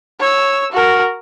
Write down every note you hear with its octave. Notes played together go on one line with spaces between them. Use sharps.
C#5 E6
F#4 A#4